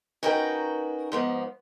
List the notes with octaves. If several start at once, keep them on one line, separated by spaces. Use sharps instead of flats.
C#4 D#4 F#4 A#4 B4 G5
G#2 F3 B3